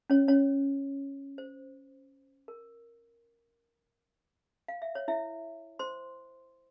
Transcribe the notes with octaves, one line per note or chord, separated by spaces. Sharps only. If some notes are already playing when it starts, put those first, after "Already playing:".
C#4 C#5
C#4 C#5
C5
A#4
F5
E5
C#5
E4 E5
C5 C6